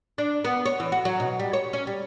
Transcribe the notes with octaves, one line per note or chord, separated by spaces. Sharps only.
D4
B3
C#5
E3
F#4
F#3
B2
G3
C#5
C#4
G3